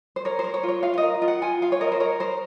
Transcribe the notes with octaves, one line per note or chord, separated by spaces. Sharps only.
C5
A#4 C#5
C5
A#4
C#5
F4
C#5
F4 F5
F5
A#4 D#5
F4
F#5
F4 G#5
F4 F5
C#5
A#4 D#5
C5
A#4 C#5
A#4 C5